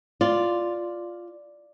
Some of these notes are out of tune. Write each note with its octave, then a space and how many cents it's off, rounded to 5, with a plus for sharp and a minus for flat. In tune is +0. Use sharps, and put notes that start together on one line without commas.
F4 +0 D5 +0